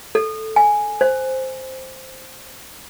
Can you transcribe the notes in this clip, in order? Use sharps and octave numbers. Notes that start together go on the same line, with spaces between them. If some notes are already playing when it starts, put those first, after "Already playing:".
A4
G#5
C5